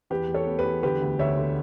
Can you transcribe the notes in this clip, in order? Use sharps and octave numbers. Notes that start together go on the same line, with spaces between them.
E2 G4 B4
E2
A4 C#5
B3
G4 B4
E2
D3 G4 B4
D2
D2 C#5 E5
D3